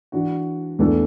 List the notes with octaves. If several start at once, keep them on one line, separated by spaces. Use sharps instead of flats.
E3 D4 F#4
E2 E3 A3 D4 A4